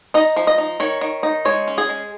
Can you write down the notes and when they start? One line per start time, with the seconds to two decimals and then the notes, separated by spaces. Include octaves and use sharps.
0.14 D#4 D#5
0.36 F3
0.47 D#5
0.58 D#4
0.80 D#3 C#5
1.01 D#3
1.23 D#4
1.45 G#3 C#5
1.67 C#4
1.78 G#4
1.89 G#3